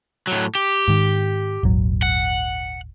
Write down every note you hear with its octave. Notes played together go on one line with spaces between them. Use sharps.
A2 F#3
G4
G#2 D#3
D#1 G#1 F#3
F#5